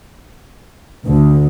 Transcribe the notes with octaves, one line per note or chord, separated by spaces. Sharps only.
D2